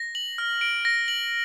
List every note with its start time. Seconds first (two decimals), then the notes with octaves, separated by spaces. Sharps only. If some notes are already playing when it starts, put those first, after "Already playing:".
Already playing: A#6
0.15 F#7
0.38 F6
0.61 D7
0.85 A#6
1.08 F#7